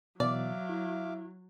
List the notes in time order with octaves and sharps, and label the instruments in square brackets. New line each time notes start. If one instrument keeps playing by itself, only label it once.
[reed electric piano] B2 E3 [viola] F#3 [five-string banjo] D5 [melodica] E5 F5 D6
[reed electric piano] E4